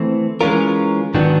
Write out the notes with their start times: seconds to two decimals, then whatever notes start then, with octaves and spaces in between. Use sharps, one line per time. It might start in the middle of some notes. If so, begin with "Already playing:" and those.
Already playing: E3 A3 C4
0.41 E3 G#3 C#4 F4 A#4
1.14 G#2 D#3 F#3 B3 D4